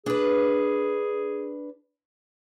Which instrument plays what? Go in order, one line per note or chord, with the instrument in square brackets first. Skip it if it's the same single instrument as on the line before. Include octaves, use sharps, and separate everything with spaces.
[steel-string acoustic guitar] D4 B4 [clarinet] G#4